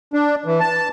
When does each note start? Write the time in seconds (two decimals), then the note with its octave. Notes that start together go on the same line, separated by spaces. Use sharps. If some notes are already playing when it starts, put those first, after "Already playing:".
0.13 D4
0.46 E3
0.60 A5